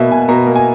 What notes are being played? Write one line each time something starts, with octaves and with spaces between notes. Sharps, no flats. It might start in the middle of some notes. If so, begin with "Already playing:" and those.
Already playing: B2 A#3 B4 E5
B2 G#5
B2 A#5
A#3
G#5